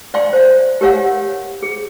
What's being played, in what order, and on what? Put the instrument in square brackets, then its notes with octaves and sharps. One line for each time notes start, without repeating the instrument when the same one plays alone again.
[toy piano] D5 F5 G5 C6
C5 F5
G4 A#4 C#5 F5 F#5
G#4